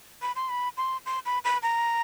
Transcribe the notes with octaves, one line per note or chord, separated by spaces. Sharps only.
B5
C6
B5
C6
C6
B5
B5
A#5